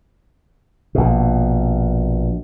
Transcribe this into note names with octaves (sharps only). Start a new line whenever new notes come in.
A#1 B2